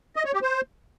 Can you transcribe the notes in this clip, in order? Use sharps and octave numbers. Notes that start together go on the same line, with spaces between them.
D#5
C#5
G4
C5